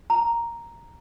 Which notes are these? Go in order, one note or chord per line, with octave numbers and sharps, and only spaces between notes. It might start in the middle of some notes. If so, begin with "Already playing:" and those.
A#5